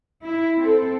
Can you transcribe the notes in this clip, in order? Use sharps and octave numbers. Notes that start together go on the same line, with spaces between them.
E4
C4 A4